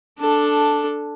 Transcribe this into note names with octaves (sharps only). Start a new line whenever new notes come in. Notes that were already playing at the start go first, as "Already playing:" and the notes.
D4 A4